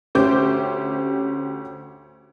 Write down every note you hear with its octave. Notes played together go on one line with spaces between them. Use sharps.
D2 C#4 G4 C5 D6 G6